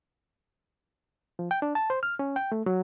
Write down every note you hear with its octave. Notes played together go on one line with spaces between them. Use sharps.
F3
G5
D4
A5
C5
F6
C#4
G5
A3
F#3